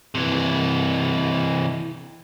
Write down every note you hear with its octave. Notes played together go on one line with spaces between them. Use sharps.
C3 E3